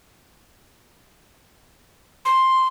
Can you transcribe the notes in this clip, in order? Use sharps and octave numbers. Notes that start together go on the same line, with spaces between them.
C6